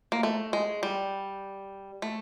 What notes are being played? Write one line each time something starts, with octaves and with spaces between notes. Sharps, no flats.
A#3
A3
G#3
G3
A3